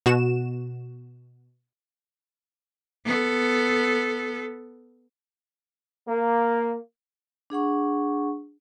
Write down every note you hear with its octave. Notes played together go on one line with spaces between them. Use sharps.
B2 F#4 E7
B3 A4
A#3
D4 G#4 F#5 C#6